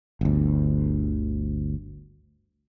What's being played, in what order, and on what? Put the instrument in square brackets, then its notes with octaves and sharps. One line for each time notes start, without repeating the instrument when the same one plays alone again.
[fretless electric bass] G1 D2